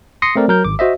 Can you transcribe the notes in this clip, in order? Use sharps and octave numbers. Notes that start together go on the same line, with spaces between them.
C6 D#6 A#6 C7 C#7
A3 C4 A#4 D5
F#3 A#4 G6
G#1 D6
F#4 C5 D#5 E5